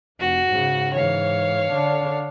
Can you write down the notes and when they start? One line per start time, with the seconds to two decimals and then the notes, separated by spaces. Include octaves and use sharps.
0.20 F1 F#4
0.49 G#2 C#3
0.93 G#2 E3 C#5 F5
1.72 D3 D4